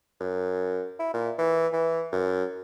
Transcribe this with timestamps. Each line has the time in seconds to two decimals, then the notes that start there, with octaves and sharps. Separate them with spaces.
0.20 F#2
0.99 E4
1.14 A#2
1.38 E3
1.73 E3
2.13 F#2